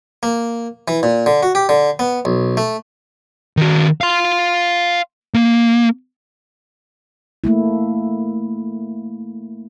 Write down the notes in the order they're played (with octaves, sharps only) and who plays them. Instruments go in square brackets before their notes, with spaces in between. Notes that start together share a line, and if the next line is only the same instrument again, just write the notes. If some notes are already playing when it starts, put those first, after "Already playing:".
[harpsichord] A#3
E3
A#2
D3
F#4
G4
D3
B3
B1
A3
[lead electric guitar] D#3 F#4
F5 C6
A#3
[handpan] A3 A#3 E4